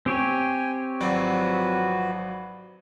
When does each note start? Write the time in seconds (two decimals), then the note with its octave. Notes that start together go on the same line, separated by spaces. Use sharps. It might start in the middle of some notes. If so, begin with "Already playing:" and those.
0.06 C4 G4 C#5 G5 G#5
1.00 G#1 F3 F#3 F#4 B4 D5